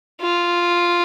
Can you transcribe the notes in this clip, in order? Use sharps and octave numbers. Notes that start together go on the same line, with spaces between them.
F4